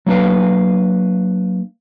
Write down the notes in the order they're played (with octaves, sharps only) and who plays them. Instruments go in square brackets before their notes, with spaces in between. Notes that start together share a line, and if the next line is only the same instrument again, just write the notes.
[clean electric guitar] F#3 A#3 D4 B4 F5